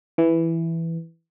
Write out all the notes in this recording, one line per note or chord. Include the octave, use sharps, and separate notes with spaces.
E3